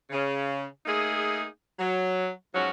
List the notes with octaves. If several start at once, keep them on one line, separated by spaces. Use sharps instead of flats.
C#3
A3 A#3 D#4 G#4
F#3
G#2 F3 F#3 C#4 F#4